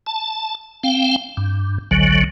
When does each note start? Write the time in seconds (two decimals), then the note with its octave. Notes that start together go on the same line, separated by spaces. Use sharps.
0.06 A5
0.83 C4 F5 G5
1.37 G2
1.91 G#1 C#2 D3 F#3